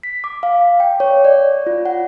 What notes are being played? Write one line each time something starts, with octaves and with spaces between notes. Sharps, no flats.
B6
D6
F5
G5
C#5
D5
F4
F#5